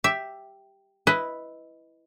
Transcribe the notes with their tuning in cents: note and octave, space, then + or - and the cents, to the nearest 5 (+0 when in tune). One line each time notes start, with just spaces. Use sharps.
G4 +0 E5 +0
E4 +0 B4 +0 D#5 +15